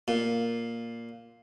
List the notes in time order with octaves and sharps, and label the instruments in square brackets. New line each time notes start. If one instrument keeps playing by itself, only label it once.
[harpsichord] A#2